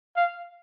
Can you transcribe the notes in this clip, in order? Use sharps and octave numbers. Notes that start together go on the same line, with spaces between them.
F5